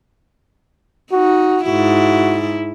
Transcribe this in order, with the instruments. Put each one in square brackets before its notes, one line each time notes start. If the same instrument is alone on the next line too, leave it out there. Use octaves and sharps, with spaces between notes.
[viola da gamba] D#4 [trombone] F#4
[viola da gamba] G#2 E4 [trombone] F#4